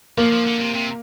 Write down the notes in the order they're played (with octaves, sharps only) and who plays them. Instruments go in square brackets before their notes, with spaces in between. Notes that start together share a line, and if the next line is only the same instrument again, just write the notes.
[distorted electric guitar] F3 [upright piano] A#3
[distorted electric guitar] F3
D3
C3
C3